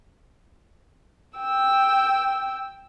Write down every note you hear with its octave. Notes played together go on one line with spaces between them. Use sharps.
G5 E6